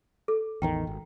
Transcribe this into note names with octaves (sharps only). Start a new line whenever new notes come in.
A4
A1 E2 D#3 G5 A#5
G#1